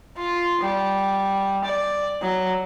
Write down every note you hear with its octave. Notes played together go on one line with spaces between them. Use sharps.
F4
G3
D5
F#3